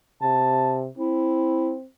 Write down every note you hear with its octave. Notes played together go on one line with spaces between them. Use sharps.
C3 A5
C4 E4